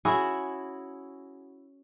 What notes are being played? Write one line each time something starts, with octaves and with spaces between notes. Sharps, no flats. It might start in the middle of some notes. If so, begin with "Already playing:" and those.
C#4 E4 F#4 G#4